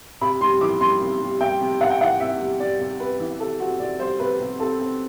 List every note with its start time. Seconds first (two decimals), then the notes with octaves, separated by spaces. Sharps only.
0.21 C3 B5
0.41 G3 C6
0.61 E3 D6
0.81 G3 C6
1.01 C3
1.20 G3
1.41 G3 G5
1.61 C3
1.80 C3 F#5
1.90 G5
2.01 E3 F#5
2.20 C3 E5
2.40 G3
2.60 G3 D5
2.80 C3
3.00 C3 B4
3.20 E3
3.40 C3 A4
3.60 C4 F#4
3.80 C3 D5
4.00 G3 C5
4.20 C3 B4
4.40 C3
4.59 C4 A4
4.79 C4